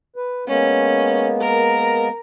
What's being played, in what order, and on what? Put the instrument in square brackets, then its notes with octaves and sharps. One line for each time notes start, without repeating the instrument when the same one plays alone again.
[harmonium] B4
[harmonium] G#3 A#3 B3 [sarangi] C#4
[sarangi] A#4